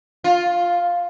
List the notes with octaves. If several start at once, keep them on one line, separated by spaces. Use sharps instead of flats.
F4